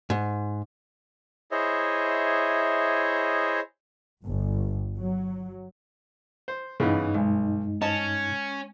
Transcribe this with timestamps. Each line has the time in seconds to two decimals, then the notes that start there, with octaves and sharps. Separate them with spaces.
0.10 G#2
1.51 E4 G#4 C5 C#5 D#5 E5
4.26 G1
4.96 F#3
6.48 C5
6.80 G2 C#3 E3 B3 D#4
7.15 B1 G#3
7.82 C#4 D#5 A5